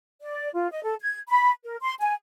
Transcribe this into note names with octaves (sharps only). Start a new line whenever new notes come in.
D5
F4
D#5
A4
G#6
B5
A#4
C6
G#5